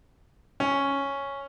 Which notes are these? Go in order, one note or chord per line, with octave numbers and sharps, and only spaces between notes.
C#4